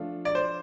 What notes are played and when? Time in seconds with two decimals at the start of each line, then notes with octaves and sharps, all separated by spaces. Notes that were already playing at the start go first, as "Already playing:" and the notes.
Already playing: F3 A3 D4 F4
0.25 D5
0.35 C5